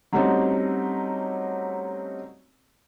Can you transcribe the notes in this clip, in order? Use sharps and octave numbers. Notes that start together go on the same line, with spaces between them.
F#3 G3 A3 C4 C#4 D#4